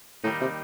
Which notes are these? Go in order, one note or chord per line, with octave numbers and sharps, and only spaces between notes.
D#2 A2 D#3 G3 A#3 D#4
C3